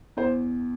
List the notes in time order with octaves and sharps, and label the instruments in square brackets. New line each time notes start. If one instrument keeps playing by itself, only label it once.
[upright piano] E2 C5